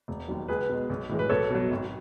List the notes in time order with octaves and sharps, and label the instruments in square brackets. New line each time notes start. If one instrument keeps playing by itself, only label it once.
[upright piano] E1
D#2 D#3 F#3
C#2 G#4 B4
B2 G#3
B1
A2 E3 G#3
B4
B1 A4 C#5
B2 F#3
G#1